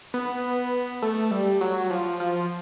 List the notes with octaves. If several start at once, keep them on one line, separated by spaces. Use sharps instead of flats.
B3
A3
G3
F#3
F3
F3